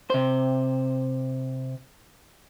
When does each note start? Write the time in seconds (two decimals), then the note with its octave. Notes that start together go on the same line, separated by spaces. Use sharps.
0.10 C3 C5